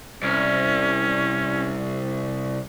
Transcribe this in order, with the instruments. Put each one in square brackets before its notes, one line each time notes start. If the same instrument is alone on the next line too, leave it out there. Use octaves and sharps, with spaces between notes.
[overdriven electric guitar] C2 [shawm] C#4